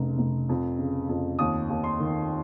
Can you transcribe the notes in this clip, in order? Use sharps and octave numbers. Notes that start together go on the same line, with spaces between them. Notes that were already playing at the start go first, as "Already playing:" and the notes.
Already playing: F1 C#3
F1
F2
C#3
F2
D#2 D#6
D#2
C6
D#3